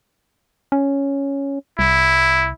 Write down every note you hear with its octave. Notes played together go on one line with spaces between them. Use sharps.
C#4
C2 E4